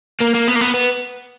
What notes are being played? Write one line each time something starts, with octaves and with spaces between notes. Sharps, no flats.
A#3
A#3
B3
A#3
B3
B3